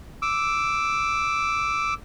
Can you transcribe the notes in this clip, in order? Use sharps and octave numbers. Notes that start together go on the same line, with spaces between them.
D6 E6